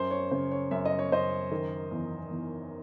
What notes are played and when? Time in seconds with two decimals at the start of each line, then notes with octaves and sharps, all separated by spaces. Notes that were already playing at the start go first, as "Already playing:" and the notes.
Already playing: F#2 C5
0.11 C#5
0.31 C#3 C5
0.52 C#5
0.71 F#2 E5
0.85 D#5
0.99 C#5
1.11 F#2 C5 D#5
1.51 D#3
1.91 E2
2.31 E2